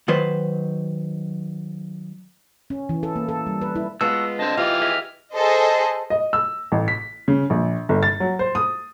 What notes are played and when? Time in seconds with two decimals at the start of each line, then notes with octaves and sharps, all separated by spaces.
0.08 D#3 F#3 B4 C5
2.70 C#4
2.89 E3
3.03 A4
3.16 A#3
3.29 A4
3.47 G3
3.61 B4
3.76 E4
4.01 G#3 B3 F4 F#4 A5 E6
4.39 D3 C4 D#5 A5
4.57 E3 F4 G4 F6
4.82 G#4 D#5 E5
5.35 G#4 A4 C5 D#5
6.10 D#5
6.33 E6
6.72 A1
6.88 B6
7.28 C#3
7.50 A#1
7.89 G1
8.03 A6
8.20 F#3
8.39 C5
8.55 D#6